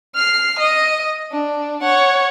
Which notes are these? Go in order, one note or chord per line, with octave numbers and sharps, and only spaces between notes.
F6 C7
D#5
D4
C#5 F#5